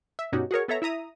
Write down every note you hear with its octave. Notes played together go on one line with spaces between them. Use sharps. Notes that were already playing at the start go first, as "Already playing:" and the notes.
E5
G2 B2 C#4 D#4 F#4 G4
F#4 G#4 A#4 C#5
B3 A4 C#5 E5 A#5
E4 E5 A#5 D#6